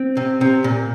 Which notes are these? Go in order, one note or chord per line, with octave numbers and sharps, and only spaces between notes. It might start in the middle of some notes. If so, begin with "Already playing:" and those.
Already playing: C4
C3
C3
A#2